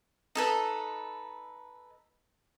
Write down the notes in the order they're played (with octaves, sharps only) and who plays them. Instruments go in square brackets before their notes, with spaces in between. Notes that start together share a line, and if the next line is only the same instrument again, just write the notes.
[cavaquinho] D#4 A4 B4